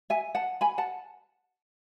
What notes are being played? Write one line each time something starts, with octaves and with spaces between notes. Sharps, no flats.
E5 G#5
F#5 A5
G#5 B5
F#5 A5